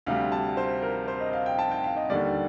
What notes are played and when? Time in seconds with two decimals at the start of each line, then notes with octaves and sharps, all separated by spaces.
0.06 D2 C3 G3 F5
0.32 A5
0.57 C5
0.82 A#4
1.08 C5
1.21 D#5
1.33 F5
1.46 G5
1.59 A5
1.71 G5
1.84 F5
1.97 D#5
2.10 D#2 D3 G3 D5